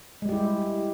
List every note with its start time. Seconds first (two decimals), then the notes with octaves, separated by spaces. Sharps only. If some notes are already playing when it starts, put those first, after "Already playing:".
0.22 G#3
0.26 G3
0.29 G4
0.32 E4